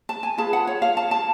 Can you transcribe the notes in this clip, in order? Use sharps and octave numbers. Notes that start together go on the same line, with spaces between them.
A5
G#5
F4 G#4 B4 A5
F#5
C#5
F5
A5
A5